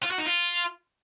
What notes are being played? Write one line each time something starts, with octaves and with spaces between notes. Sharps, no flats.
F4
F#4
D#4
F4